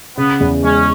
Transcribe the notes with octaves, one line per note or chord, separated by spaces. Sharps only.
C#3 B3
E2
G#3 C#4